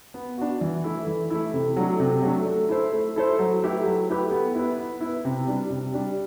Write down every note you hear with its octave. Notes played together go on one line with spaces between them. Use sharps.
B3
D4 F#4
E3
A3 E4
E3
A3 E4
C3
F#3 A3 D4
C3
F#3 A3 D4
A3
E4 A4 C5
A3
E4 A4 C5
F#3
A3 E4 G4 B4
F#3
A3 E4 G4 B4
B3
E4 B4
B3
E4
B4
C3
G3 D4
C3
G3 D4